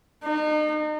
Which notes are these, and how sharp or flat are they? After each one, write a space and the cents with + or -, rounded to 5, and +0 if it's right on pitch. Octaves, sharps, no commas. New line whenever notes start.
D#4 -35